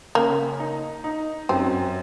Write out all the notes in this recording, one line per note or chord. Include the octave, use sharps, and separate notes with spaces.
C#3 A#3
D#4
D#4
F#2 C4